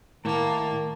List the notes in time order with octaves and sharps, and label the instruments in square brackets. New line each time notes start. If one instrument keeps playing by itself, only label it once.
[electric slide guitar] A2 [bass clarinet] D#3 [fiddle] A#3 [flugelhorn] A5